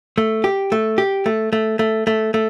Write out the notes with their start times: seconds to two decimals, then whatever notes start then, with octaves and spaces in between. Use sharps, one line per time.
0.18 A3
0.44 G4
0.72 A3
0.98 G4
1.26 A3
1.53 A3
1.79 A3
2.07 A3
2.34 A3